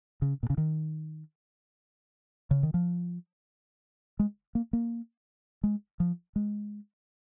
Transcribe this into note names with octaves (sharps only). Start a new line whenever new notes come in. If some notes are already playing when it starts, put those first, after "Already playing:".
C#3
A#2
C#3
D#3
C#3
D#3
F3
G#3
A#3
A#3
G#3
F3
G#3